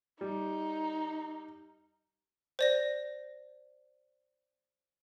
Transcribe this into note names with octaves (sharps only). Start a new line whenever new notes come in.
G3 D#4
C5 D5 A#6